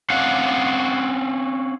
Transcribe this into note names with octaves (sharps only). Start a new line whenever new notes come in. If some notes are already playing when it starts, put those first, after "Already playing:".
C4 C#4 F5 F#5